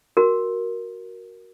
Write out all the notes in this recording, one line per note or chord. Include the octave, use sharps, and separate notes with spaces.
F#4 A#4